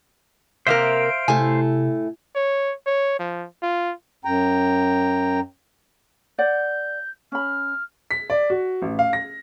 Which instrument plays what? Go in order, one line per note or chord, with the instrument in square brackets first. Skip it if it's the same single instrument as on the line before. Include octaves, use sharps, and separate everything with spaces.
[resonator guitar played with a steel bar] C3 A#3 A#4 [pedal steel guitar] C5 E5 F5 [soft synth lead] D7
[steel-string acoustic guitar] A2 A3 [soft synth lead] C3 [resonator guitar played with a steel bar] G#5
[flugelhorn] C#5
C#5
F3
F4
[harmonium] F#2 G5 A#5
[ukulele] D5 F#5 [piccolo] G6
[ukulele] C#4 B5 [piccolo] F6
[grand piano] B6
D5
F#4
A1
F5
A#6